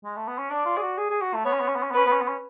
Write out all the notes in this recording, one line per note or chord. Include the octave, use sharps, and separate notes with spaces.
G#3
A3
B3
C#4
D4 D5
F4
G#4
F#4
G#4
G#4
F#4
A3
B3 C#5
C#4
B3
C#4
B3
C#4
B3
C#4 B4
B3
C#4
B3
C#4